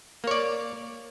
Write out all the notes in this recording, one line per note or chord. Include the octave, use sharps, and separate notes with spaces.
A#3 C#5 D5